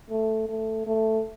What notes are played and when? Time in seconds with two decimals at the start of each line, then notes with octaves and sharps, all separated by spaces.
0.10 A3
0.49 A3
0.86 A3